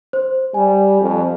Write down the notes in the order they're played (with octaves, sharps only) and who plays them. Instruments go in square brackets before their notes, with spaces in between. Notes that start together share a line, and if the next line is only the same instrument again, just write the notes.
[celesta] C5
[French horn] G3 [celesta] G#5
[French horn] F2